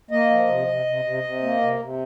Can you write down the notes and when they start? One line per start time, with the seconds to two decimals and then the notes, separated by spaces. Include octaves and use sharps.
0.11 A#3 D#5
0.30 F3
0.48 C3
0.68 C3
0.86 C3
1.05 C3
1.24 C3
1.43 A#3
1.61 C3
1.80 C3